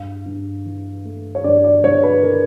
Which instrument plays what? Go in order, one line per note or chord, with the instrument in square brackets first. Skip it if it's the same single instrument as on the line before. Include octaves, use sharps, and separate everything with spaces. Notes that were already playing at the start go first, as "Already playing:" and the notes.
Already playing: [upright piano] G2 F5
G2
E3
A3
C#5
G2 D5
D5
G2 C#5
B4
E3 A#4